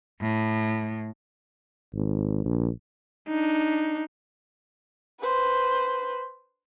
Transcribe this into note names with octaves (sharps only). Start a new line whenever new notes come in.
A2
G#1
A#1
D4 D#4
B4 C5